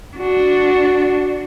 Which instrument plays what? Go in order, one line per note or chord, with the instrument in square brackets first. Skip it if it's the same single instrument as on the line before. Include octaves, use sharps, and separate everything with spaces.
[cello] D4 F#4